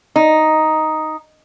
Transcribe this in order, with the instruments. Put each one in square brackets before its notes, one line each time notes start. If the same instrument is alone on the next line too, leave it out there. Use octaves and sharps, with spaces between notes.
[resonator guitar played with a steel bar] D#4